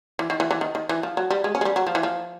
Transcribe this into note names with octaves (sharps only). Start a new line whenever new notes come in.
E3
D#3
E3
E3
D#3
D#3
E3
F3
F#3
G3
G#3
C#4
G#3
G3
F#3
F3
E3
F3